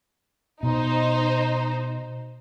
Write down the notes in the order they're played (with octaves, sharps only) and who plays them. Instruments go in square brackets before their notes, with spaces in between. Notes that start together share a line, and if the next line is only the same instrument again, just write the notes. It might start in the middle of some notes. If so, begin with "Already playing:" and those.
[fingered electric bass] B2 [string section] D#4 C5